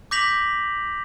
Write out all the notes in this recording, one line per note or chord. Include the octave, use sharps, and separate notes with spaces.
D6 G6 A#6 B6 F7 F#7